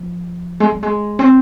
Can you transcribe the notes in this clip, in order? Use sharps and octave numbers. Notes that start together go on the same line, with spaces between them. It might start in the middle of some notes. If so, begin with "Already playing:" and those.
Already playing: F3
G#3
G3
G#3
C4